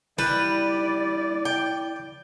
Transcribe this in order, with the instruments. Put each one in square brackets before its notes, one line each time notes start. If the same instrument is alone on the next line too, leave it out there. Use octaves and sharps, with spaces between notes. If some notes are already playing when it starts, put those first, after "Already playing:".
[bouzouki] G3 [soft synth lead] E4 [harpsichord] B4 [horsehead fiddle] D5
[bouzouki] G5